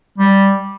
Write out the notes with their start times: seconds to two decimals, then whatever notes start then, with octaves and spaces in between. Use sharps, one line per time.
0.18 G3